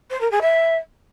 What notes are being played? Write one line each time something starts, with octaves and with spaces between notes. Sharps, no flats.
C5
A#4
G#4
E5